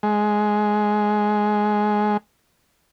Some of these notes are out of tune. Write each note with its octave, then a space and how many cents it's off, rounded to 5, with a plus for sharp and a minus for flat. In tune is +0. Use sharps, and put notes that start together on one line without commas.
G#3 +10